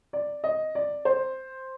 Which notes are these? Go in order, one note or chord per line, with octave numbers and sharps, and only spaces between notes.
D5
D#5
D5
C5